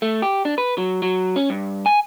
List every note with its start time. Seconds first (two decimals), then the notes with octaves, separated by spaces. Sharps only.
0.02 A3
0.22 G4
0.45 D4
0.58 B4
0.78 F#3
1.02 F#3
1.36 C#4
1.50 G2
1.86 G#5